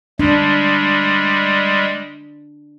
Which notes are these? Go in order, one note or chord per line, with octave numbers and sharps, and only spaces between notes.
G3 G#3 D4